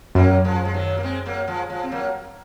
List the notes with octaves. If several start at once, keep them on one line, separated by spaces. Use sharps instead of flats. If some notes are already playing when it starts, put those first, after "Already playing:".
F#2 F#3 A#3
F3 G#3
G#3
D#3 F#3
A#3
G#3 C4
F#3 A#3
F3 G#3
F3 G#3
C4
F#3 A#3